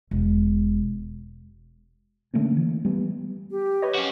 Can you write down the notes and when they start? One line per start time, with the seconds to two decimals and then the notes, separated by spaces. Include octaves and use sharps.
0.11 E1
2.34 D3 A3 A#3 C#4
2.57 E3
2.85 G3 B3
3.51 G4
3.82 B4 C#5 D#5
3.95 C#4 F#4